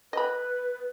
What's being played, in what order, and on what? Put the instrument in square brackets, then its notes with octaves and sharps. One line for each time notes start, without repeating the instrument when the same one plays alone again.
[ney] B4 [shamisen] D#5 B5